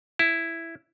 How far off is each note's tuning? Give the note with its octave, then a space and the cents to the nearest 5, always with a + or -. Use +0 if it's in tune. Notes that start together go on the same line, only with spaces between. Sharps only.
E4 +5